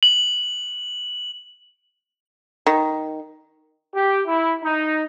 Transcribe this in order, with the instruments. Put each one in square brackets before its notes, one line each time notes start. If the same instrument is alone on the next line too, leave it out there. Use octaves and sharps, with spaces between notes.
[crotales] F#7
[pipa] D#3
[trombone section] G4
E4
D#4